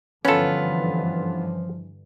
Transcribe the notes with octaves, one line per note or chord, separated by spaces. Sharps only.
G2 D3 E3 F3 B3 C#4 F4 A4